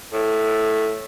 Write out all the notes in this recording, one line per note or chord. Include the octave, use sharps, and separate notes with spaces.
A2